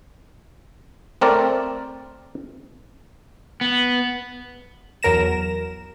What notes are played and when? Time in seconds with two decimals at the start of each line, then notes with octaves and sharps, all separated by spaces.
1.21 A3 C4 A#4 D5
3.61 B3
5.03 E2 F#3 A#4 A#6 E7